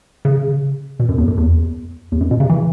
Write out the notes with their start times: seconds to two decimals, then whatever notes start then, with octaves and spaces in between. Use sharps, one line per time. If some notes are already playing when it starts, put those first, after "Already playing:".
0.25 C#3
1.00 B2
1.09 F#2
1.18 E2
1.28 F#2
1.37 E2
2.12 E2
2.21 F#2
2.31 B2
2.40 C#3
2.49 E3